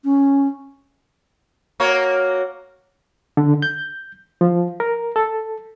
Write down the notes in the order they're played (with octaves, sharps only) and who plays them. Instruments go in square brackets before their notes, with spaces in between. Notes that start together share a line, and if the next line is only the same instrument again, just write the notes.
[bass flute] C#4
[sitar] A#3 F#4 C#5
[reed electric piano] D3
G6
F3
A#4
A4